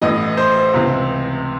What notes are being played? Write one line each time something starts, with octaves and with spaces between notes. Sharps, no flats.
A1 A2 E3 D#5
C5
C#2 C3 E3